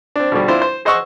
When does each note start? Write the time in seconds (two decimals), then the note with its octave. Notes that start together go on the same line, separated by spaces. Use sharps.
0.16 C4 D4
0.32 B2 D3 F3 G3
0.48 C4 D4 E4 F4 C5
0.62 C5
0.85 G#4 C5 D#5 F#5 C#6 E6